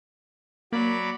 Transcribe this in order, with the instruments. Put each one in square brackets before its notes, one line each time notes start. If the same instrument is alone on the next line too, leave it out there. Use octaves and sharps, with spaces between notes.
[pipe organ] F#3 D5 B5 [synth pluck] A#3